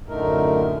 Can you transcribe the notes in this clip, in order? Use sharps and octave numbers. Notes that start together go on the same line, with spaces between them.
F#2 A2 D3 A3 D#4 A#4